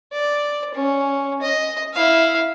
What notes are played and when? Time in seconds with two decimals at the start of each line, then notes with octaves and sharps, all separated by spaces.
0.13 D5
0.74 C#4
1.42 D#5
1.94 E4 F5